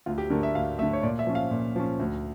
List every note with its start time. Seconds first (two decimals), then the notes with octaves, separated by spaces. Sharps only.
0.06 D2 F4
0.18 G4
0.30 D3 A3 A#4
0.43 E5
0.54 D2 F5
0.78 A3 E5
0.82 D3
0.93 C#5
1.03 A#2 D5
1.19 E5
1.27 F3 C#4
1.35 F5
1.51 A#2
1.76 F3 C#4
2.00 D2